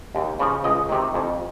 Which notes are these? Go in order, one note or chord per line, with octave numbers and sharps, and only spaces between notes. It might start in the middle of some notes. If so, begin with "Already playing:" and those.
D#2
C#3 F3
C#2 D#5
C3 D#3
F2